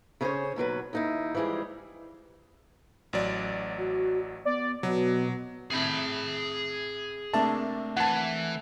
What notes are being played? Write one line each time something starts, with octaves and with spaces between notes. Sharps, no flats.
C#3 C#4 G#4 A#4 C5 C#5
D#2 B2 F#3 B4
D#2 D#4 E4
E3 F3 G3 G#3 G#4
A1 F#3 D5
F#4
B3 D5
B2 F#3 B3
A2 C3 G#4 B5
C3 A3 A#3 D4 A5
E3 F#5 A5